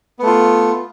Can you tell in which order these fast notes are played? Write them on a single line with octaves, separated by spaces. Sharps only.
B3 A3 F4